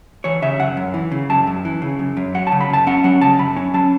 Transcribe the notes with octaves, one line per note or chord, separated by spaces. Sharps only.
E3 C#5
C#3 E5
F#2 F#5
F#2
E3
C#3
F#2 A5
F#2
E3
C#3
F#2
F#2
F#3 F#5
A5
C#3
B5
F#2 A5
C#4 F#5
F#3 F#5
C#3 A5
F#2 B5
C#4
F#3 A5